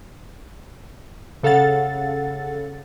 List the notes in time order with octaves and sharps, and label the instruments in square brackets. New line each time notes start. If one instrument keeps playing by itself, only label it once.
[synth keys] C#3 A4 F5 F#5 A6